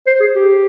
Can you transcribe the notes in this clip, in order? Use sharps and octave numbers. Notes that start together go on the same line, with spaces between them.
C5
G#4
G4